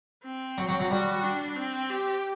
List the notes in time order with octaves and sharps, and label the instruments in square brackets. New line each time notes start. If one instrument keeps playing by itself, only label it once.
[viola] C4
[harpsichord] F#3
F#3
F#3
[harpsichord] G3 [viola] F#4
[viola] D4
C4
G4